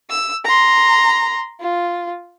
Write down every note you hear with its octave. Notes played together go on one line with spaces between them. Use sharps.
E6
A#5 C6
F4